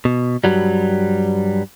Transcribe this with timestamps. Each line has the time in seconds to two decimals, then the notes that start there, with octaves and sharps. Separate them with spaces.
0.05 B2
0.44 G2 F#3 G3